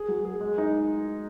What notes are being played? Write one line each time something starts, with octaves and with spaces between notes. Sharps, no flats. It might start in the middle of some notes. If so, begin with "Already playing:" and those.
Already playing: G#4
F#3
G#4
G#3
D#4